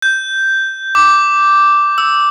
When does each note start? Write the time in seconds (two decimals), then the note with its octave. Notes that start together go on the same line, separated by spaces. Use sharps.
0.02 G6
0.95 D6
1.98 E6